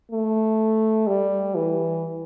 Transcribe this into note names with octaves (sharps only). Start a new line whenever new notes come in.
A3
G3
E3